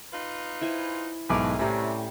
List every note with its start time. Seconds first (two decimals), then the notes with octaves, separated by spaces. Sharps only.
0.13 D#4 F4 B4
0.61 E4 C5 G#5
1.30 B1 G#2 A3 G#4 A#4 B4 D6
1.59 A2 C3 G3 C#4 A#5